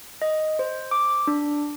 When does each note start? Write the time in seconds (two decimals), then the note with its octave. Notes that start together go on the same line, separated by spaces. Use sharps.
0.22 D#5
0.59 C5
0.91 D6
1.27 D4